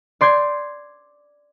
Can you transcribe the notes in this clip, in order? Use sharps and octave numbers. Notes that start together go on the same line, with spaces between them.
D5 C6 G6 G#6